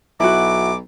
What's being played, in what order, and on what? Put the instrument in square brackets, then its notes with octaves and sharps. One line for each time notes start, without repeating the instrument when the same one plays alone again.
[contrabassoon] B1 [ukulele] E4 F#4 [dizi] D6